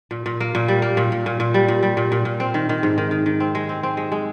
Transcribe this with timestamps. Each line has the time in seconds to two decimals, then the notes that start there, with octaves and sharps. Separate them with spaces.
0.11 A#2
0.26 A#2
0.40 A#3
0.55 A#2
0.68 G3
0.82 A#3
0.97 A#2
1.12 A#2
1.26 A#2
1.40 A#2
1.54 G3
1.68 A#2
1.83 G3
1.97 A#2
2.12 A#2
2.25 A#2
2.40 C4
2.54 D#3
2.69 D#3
2.83 G#2
2.98 D#3
3.11 D#3
3.26 D#3
3.40 C4
3.55 G#3
3.69 C4
3.83 C4
3.97 G#3
4.12 G#3